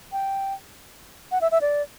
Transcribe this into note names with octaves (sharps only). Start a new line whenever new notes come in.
G5
F#5
E5
E5
D5